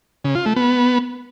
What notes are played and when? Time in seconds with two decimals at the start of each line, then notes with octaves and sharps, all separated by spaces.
0.24 C#3
0.35 F4
0.46 A3
0.56 B3